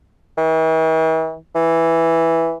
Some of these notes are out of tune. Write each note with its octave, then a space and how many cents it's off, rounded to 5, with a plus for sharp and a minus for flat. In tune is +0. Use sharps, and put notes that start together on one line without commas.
E3 -45
E3 +0